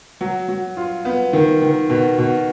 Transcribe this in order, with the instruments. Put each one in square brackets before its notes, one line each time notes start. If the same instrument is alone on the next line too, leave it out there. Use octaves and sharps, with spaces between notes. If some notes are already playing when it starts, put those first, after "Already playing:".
[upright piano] F#3
F#3
F4
B3
D#3
D#3
B2
B2